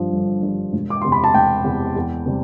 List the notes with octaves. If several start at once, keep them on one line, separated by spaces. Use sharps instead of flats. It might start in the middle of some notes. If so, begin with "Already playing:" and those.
Already playing: G1 G2 F3
G1
G2 F3
E1
D6
E2 C3 C6
B5
A5
E1 G5
E2 C3
E2
C3 G3